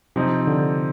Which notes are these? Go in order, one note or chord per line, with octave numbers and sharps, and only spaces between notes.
C3 F3 C4 D#4
D3